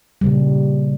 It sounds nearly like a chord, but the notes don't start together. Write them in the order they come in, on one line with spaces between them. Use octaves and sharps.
G3 C#3 A#2